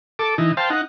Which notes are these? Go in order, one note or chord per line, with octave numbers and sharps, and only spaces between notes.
A4 D6
E3 D#4
C5 F5 G5 A5
D#4 F#5